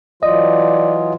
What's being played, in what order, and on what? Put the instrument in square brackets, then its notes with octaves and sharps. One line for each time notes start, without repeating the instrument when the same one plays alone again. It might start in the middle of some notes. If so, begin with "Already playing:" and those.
[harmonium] E3 F#3 F4 [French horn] D5 [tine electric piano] D#5